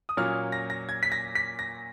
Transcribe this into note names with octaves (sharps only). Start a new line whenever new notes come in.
D#6
A#2 F#3 A#3 C#4 F4 F6
A#6
A#6
G#6
B6
A#6
B6
A#6